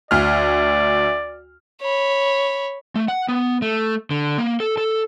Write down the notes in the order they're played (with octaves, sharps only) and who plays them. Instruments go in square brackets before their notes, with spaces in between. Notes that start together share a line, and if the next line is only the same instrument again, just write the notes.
[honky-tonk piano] D2 F6 [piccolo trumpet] D5
[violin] C#5 B5
[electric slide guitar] A3
F#5
B3
A3
D3
A#3
A4
A4